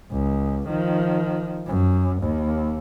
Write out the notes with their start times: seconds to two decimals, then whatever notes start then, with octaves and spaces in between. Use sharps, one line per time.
0.11 C#2
0.68 D#3 F3
1.66 F#2
2.22 D#2